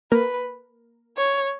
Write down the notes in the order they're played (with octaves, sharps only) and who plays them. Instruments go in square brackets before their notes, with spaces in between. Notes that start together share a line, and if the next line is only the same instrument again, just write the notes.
[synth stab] A#3 A#4 [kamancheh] B4
[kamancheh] C#5